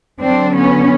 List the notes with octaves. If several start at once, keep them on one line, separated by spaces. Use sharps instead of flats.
D3 F#3 C4 D4
B3 C#4